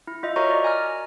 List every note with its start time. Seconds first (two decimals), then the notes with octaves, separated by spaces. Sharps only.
0.07 E4
0.23 F4 D#5 E5
0.36 F#4 A#4 C#5 D#5 A#5 C#6
0.50 D5 D#5
0.64 G#5 A#5 F6